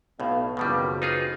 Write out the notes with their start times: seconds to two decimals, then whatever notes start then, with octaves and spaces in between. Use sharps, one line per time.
0.20 B1 A2 B3 F5
0.57 F#1 F2 B2 D#3 G3 B4
1.02 D#4 F4 G#4